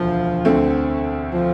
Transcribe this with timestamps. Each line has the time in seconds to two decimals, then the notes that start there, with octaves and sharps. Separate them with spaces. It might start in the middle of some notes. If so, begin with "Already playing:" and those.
Already playing: E1 D2 F3
0.45 D2 D3 A3 C4
1.32 F3